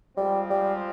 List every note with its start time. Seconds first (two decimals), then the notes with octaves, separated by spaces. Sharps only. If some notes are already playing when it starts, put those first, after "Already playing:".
0.17 F3 G3 G#3 C4
0.50 G3